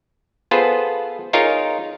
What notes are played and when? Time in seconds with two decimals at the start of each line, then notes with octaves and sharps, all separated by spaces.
0.51 B3 F4 G#4 A4 B4 C5
1.33 D#4 F4 G#4 A#4 C#5